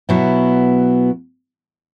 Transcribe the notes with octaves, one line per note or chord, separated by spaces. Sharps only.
B2 F#3 B3 E4